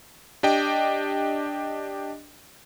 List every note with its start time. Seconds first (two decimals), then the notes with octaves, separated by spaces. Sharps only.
0.43 D4 G4 D#5 G5